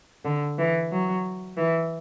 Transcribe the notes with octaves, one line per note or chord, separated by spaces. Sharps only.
D3
E3
F#3
E3